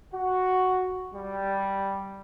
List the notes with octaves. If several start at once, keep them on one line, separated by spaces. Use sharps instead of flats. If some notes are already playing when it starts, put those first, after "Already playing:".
F#4
G3